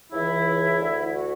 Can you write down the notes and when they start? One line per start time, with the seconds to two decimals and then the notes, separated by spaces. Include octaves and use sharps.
0.12 C#2 C#3 E3 E4
0.80 D2 D3
1.14 F#4